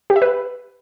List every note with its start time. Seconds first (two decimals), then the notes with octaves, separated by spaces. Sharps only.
0.10 G4
0.16 E5
0.22 B4